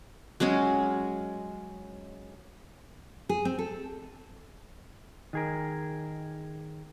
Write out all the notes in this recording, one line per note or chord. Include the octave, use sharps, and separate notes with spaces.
F#3 G#3 C#4 G#4
G#4
C4
A4
D#3 G#4 A#4